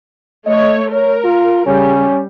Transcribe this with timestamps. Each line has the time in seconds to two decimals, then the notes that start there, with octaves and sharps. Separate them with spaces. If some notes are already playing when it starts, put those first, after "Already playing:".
0.46 A3 C#5 D#5
0.92 A#4 C#5
1.24 F4
1.66 C#3 G3 C#4